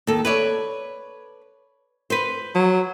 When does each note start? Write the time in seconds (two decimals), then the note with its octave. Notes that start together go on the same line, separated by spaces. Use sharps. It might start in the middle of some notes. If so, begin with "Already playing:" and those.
0.07 D#2 A4
0.25 B4 C#5 D5
2.10 B4 C5
2.55 F#3